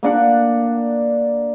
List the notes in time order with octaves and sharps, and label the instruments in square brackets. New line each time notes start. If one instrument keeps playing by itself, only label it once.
[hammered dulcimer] A#3 D4 F#5